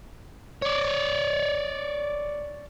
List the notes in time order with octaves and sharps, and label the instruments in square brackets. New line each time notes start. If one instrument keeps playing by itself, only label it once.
[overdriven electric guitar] C#5 D5